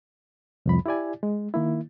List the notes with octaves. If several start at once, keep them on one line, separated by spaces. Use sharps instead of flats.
C2 F2 B5
E4 G4 D5 G#5
G#3
D#3 A#3 E4